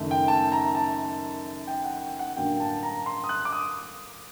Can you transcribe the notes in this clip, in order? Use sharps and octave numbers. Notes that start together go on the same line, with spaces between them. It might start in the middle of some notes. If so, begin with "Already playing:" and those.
Already playing: F#1 F#2 D#3 A3
G5
A5
A#5
A5
G5
F#5
G5
F#5
A1 G2 D3 F#3 A#3 G5
A5
A#5
C6
D#6
F#6
D6
D#6